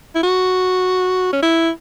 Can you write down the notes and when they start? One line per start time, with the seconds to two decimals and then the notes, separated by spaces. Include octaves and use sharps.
0.15 E4
0.23 F#4
1.33 C#4
1.43 E4